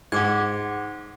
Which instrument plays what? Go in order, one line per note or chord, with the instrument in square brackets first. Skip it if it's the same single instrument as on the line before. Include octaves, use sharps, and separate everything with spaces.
[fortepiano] G#2 [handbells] F#5 D6 G#6